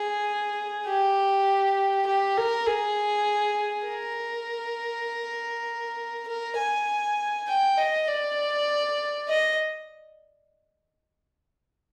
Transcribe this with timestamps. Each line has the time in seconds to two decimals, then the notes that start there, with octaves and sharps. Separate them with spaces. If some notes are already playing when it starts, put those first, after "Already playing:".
Already playing: G#4
0.87 G4
2.07 G4
2.37 A#4
2.66 G#4
3.87 A#4
6.27 A#4
6.58 G#5
7.48 G5
7.78 D#5
8.08 D5
9.28 D#5